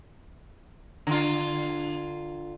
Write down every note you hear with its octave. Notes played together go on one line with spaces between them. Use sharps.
D3 F4